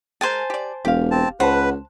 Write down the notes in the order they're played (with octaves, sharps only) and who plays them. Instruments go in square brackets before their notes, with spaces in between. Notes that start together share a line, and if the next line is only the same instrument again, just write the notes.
[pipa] G#3 A#4 [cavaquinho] C5 G#5 A5
[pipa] G4 D5
[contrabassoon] E1 [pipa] G4 F5
[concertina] C4 A5
[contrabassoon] C#2 [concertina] B4 [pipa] C5 A5 [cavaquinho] F#5